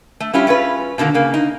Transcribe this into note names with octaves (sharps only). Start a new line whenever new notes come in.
A3
G3 C#4 E4 F4 G4
C#4 F4 G#4 B4
B2 D3 D#3 A#3
C#3 A#3
D#4